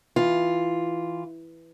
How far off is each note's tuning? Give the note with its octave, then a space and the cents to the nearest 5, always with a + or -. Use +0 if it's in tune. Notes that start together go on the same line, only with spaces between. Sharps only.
E3 +0 F4 +0